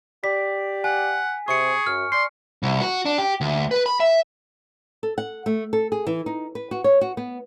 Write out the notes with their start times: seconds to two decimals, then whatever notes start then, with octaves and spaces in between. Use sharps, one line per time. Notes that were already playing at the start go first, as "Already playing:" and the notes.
0.24 G4 D5 B6
0.84 F#5 G#5
1.48 C3 G#4 C#6 C#7
1.87 F#2 F6
2.12 D5 C6 C7
2.63 C2
2.81 F#4
3.05 D4
3.18 G4
3.41 D2
3.71 B4
3.86 B5
4.00 E5
5.03 A4
5.18 F#5
5.46 A3
5.73 A4
5.92 G#4
6.07 E3
6.26 D#4
6.55 B4
6.71 F#4
6.84 C#5
7.01 F#4
7.17 B3